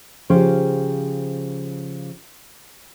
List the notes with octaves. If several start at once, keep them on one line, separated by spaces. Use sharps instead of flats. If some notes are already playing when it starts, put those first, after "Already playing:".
C#3 F3 C#4 G4 C5